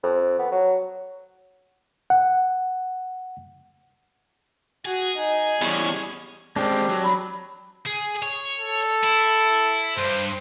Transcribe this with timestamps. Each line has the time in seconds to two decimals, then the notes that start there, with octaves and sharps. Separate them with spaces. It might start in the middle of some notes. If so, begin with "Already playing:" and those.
0.03 F2
0.39 B3
0.51 F#3
2.10 F#5
4.85 F#4 G#4
5.17 D#4 G#5
5.61 E2 G3 C#4
6.56 G#3 C4 D4 G4
6.89 F#3
7.04 B5
7.86 G#4
8.22 C#5
8.59 A4
9.04 E4
9.97 G2 C5